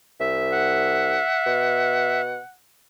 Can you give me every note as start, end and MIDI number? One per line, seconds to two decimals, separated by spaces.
0.20 1.19 36
0.20 2.21 76
0.52 2.54 78
1.46 2.38 47